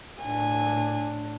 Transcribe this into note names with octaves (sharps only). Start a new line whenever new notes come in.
A2 D4 G#5